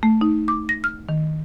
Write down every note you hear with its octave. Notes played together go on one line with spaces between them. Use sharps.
A3
D#4
D6
A#6
F6
D#3